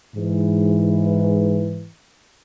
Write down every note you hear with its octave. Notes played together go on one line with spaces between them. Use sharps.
G#2 E3